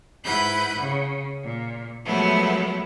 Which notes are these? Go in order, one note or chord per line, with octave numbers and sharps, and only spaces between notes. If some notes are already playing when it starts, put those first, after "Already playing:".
G#2 E4 B4 F#5 B5 G6
C#3
A#2
F3 F#3 G#3 A3 B3 E4